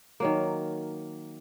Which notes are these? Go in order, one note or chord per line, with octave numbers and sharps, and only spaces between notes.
D#3 F#3 A#3